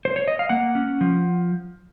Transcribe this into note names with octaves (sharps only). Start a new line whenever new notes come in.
C5
C#5
D#5
F5
A#3 F#5
C#4
F3